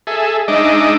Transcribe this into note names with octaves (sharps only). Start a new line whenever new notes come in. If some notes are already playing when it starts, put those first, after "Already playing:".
G#4 A4 E5
G#3 D4 D#4 D#5 E5 D6